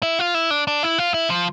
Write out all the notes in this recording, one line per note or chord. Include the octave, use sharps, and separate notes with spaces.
E4
F4
E4
D4
D4
E4
F4
E4
F3